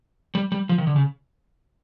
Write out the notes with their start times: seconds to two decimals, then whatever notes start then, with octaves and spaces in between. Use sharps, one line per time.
0.35 G3
0.52 G3
0.69 F3
0.78 D#3
0.87 D3
0.96 C#3